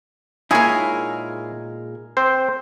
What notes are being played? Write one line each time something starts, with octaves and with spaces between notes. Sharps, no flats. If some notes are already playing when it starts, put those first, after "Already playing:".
A#2 G#3 D#4 E4 G#4 A#4 C#5
C4 C5